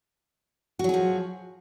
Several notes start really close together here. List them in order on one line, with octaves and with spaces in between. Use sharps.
F#4 F#3 G#4 F3